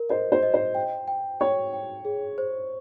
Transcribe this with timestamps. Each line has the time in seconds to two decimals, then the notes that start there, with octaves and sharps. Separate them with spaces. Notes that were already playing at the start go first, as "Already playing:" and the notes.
Already playing: A#4
0.09 C5 D#5
0.32 C5
0.43 D#5
0.54 C5
0.75 G5
1.08 G5
1.40 C#5 G5
1.73 G5
2.05 G#4
2.38 C5